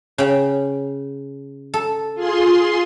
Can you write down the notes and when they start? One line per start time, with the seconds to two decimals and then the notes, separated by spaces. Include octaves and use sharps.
0.18 C#3 G5
1.74 A4
2.15 F4 G#4 C6